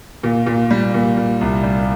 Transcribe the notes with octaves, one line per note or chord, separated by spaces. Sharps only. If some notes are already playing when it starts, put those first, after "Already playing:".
A#2
A#2
G3
A#2
A#2
C2
G3